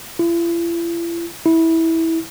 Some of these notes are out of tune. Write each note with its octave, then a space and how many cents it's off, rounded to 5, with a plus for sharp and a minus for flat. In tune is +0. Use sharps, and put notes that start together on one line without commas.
E4 +45
E4 -15